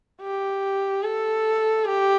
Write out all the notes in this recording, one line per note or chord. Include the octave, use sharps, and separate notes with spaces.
G4
A4
G4